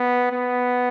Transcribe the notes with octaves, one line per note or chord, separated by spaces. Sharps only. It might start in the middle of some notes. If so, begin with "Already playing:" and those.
Already playing: B3
B3